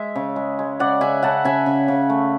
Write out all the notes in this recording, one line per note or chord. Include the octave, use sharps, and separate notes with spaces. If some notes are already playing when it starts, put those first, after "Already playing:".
Already playing: G#3 E5
C#3
G#3
G#3
C#3 D5 F#5
C#3 E5 G#5
C#3 F#5 A5
C#3 E5 G#5
C#3
C#3
A3